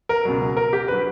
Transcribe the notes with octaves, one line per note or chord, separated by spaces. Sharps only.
A#4
C#2 B2 F#3
A#4
G4
D3 F#3 B4